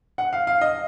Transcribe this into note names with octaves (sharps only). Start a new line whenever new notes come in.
F#5
F5
F5
D#5